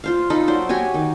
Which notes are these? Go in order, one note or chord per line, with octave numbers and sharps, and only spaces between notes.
F4 C5 F5
D#4 F4 A4 B5
F#3 C5 D5
F#4 G4 C#5 G#5
D#3